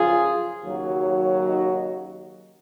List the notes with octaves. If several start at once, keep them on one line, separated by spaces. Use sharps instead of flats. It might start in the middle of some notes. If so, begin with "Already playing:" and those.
Already playing: F#2 C#3 F3 F4 G#4
D#2 C#3 F#3
D#4 F#4